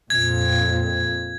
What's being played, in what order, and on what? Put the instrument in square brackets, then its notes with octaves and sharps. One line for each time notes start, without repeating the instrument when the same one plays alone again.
[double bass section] F2 A#2 [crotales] G#6